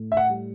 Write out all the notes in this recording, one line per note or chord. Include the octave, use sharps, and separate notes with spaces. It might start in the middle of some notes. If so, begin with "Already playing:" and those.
Already playing: A2
E5
F#5
G3